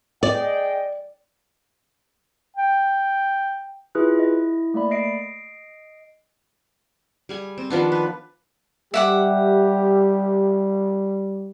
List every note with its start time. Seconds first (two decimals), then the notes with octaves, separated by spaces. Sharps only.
0.23 G#4 D5 D#5 G5
2.56 G5
3.95 E4 F4 G#4 B4 F#6
4.15 E4 D#5
4.74 A3 A#3 D5 B5
4.91 D#5 C7 D7
7.29 G3 G#4 G#5
7.58 C4
7.70 D#3 F3 B3 D4
7.92 B4
8.94 G3 G4 E5 F#5 D6